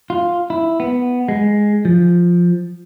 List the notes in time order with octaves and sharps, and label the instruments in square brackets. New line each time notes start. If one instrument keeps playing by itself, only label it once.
[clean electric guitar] F4
E4
B3
G#3
F3